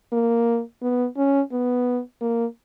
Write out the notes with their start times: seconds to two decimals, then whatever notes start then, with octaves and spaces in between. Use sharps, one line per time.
0.13 A#3
0.82 B3
1.17 C#4
1.52 B3
2.21 A#3